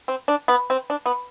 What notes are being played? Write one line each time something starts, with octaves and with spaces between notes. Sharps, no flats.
C4
D4
B3
C4
D4
B3